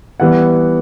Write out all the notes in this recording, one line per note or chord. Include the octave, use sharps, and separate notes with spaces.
E3 G3 B3 F#5